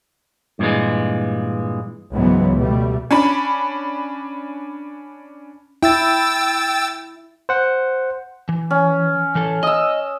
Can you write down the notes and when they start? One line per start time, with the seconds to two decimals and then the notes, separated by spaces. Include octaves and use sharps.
0.59 G2 A#2 D3 E3 G#3
2.14 C#2 G#2 E3 F#3 G#3 B3
2.55 B2 G3 A3
3.11 C#4 D4 B5
5.83 E4 G5 E6 A6
7.49 C5 F#5
8.49 E3
8.71 C#4
9.35 E3 A4
9.63 D#5 D#6 E6